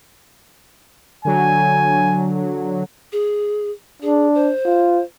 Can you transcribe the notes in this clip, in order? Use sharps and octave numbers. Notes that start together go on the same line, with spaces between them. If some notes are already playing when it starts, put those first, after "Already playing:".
D3 F#3 G#5
G#4
D4 G#4
C5
F4